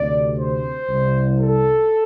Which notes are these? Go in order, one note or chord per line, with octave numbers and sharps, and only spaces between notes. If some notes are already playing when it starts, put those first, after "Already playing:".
Already playing: D2 C3 D5
C5
C2 C3
A4